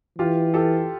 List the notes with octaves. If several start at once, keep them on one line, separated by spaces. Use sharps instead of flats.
E3 F4 G4
G4 A4